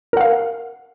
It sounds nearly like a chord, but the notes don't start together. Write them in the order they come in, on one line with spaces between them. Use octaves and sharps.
A#4 F#5 F5